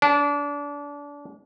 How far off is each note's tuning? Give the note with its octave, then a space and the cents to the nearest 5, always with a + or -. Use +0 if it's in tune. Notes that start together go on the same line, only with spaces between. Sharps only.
D4 -30